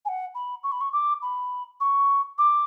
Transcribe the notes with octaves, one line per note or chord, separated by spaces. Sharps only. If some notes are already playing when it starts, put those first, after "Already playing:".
G#5
F#5
B5
C#6
B5
C#6
D6
B5
C#6
D6